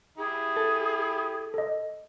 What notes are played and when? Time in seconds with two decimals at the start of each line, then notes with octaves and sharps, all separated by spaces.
0.18 E4 G4 G#4
0.56 A4
1.54 A4 D#5